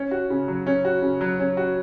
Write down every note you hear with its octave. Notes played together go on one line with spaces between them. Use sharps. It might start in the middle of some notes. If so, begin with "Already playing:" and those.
Already playing: C#4
F#4
C#3
F#3
C#4
F#4
C#3
F#3
C#4
F#4